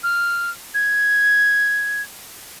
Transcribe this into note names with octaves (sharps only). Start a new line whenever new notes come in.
F6
G#6